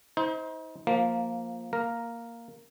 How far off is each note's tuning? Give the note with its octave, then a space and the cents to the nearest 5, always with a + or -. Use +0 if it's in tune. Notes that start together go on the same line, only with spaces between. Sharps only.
D#4 +40 C5 +0
F3 +15 A#3 +0
A#3 +0 A#4 +0